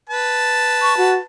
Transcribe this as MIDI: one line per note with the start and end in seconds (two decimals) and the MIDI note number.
0.09 1.22 71
0.09 1.22 81
0.82 0.94 85
0.97 1.15 66